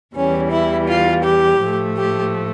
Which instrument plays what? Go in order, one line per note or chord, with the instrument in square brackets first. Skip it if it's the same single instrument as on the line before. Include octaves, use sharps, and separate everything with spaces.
[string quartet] E2 E3 G3 C#4
E4
F4
G4
A2 F3 A3
G4